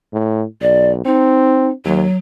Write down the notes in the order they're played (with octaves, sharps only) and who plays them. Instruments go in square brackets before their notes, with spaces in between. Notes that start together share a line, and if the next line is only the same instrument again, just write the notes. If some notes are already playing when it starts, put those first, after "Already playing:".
[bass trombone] A2
[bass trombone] B1 [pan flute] D5
[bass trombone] C4 [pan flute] D#4
[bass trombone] D#2 [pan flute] F#3